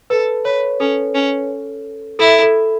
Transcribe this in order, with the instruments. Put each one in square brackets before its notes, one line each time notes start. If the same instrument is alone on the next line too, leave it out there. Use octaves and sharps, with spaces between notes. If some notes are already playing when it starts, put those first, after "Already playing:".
[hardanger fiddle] A4 [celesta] B4
[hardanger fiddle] B4 [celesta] C#5
[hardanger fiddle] C#4 [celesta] A4
[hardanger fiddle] C#4
[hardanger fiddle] E4 [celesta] A4
[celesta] A4